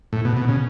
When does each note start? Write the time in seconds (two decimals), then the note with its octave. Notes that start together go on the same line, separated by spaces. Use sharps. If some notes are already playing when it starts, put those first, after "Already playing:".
0.13 A2
0.25 B2
0.37 B2
0.48 C#3